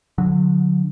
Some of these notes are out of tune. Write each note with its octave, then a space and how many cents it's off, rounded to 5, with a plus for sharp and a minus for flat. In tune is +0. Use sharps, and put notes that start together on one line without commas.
D3 +0 F#3 -30